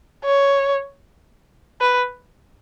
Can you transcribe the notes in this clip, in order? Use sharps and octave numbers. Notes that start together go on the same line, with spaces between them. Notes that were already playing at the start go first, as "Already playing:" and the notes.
C#5
B4